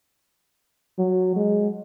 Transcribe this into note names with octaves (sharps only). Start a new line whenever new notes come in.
F#3
G#3